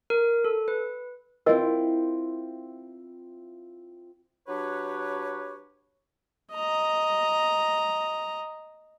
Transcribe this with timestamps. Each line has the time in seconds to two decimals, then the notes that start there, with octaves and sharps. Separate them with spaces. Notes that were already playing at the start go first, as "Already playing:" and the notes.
0.10 A#4
0.45 A4
0.68 B4
1.46 C4 E4 F4 A#4 D#5
4.48 F#3 D4 G4 B4 C#5
6.53 D#5 A#5